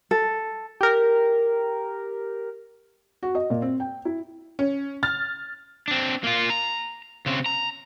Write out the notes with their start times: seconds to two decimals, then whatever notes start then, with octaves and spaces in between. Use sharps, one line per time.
0.11 A4
0.81 G4 A#4
3.23 F#4
3.35 D#5
3.50 A#2
3.62 C4
3.80 G5
4.05 E4
4.59 C#4
5.03 F6 A6
5.88 C4 D4
6.24 A#3 F4
6.50 A#5
7.26 C#3 C4
7.46 A#5